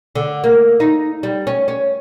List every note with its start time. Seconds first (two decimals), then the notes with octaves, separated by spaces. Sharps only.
0.15 D3
0.44 A#3
0.80 D#4
1.23 G3
1.47 C#4
1.68 C#4